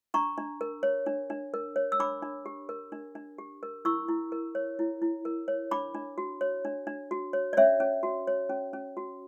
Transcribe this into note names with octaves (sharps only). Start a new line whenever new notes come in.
D4 A#5 C#6
D4
A#4
C#5
D4
D4
A#4
C#5
E6
D4 B5 D6
D4
G4
A#4
D4
D4
G4
A#4
E4 C#6 E6
E4
A#4
C#5
E4
E4
A#4
C#5
D4 B5 D6
D4
F#4
C#5
D4
D4
F#4
C#5
D5
C#4 C#5 E5
C#4
F#4
C#5
C#4
C#4
F#4